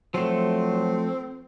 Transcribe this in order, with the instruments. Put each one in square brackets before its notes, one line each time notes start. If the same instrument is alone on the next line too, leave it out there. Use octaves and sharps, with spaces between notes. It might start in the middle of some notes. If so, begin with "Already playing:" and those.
[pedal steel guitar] F3 A3 [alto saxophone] F#3 [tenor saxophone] C4